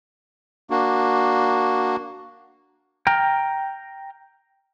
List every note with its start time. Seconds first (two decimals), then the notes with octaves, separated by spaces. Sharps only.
0.70 A#3 D4 F#4
3.07 G5 A#5 F6